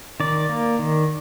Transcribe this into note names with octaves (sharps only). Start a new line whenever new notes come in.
D#3 D5
A#3
D#3